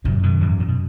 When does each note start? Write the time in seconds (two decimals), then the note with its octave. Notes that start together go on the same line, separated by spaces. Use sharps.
0.04 F#2 A#2 C#3
0.23 B2 D#3
0.41 E2 G#2
0.60 A#2
0.68 B2